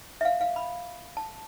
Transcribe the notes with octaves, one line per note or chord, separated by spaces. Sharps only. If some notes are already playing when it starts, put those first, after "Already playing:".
E5
F5
F5
B5
A5